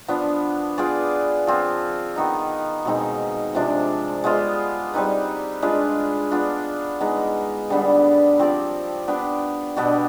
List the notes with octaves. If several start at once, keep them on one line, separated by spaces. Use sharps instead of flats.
F3 B3 D4
B3 F4 G#4 D5
F3 C4 F4
D#3 B3 D#4
B2 G#3 C4 D#4
C3 F3 G#3 D4
G#3 B3 F4 C5
G3 C4 D#4 B4
G#3 D4 F4 B4
B3 D4 F4
G#3 B3 D#4
D3 G3 B3 D4
F3 C4 G4 D5
B3 D4 G4
B2 B3 D4 G4